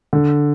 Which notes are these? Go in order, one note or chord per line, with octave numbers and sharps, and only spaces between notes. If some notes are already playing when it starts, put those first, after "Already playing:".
D3